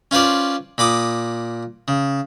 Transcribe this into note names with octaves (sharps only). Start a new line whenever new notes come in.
C#4 F4 B4 C5 D5
A#2 B5 D6 D#6
C#3